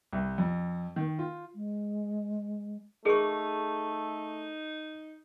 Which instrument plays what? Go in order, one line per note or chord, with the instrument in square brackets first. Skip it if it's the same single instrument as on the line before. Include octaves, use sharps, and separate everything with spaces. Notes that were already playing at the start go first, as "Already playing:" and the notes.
[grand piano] C2
F2
D#3
F4
[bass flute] G#3
[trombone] A3 [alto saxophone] D#4 [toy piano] G#4 C#6 [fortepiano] A#4